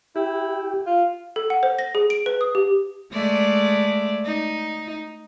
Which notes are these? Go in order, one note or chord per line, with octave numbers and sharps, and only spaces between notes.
E4 G4
F4
A4
F#5
C5
A#6
G#4
D7
B4
D#6
G4
G#3 A3 D5
D#4